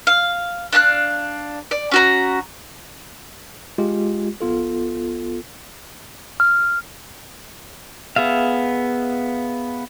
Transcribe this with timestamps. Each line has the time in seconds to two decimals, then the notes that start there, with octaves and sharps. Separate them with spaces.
0.07 F5
0.73 D4 F5 A5 F#6
1.71 D5
1.92 C#4 F#4 A#5
3.78 G#3 F4 G4
4.41 A#1 B3 F4 A4
6.40 F6
8.16 B3 G#4 E5 F5